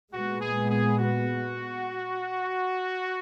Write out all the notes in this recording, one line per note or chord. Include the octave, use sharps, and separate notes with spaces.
A#2 G#3 B3 F#4
G#4
G#4
F#4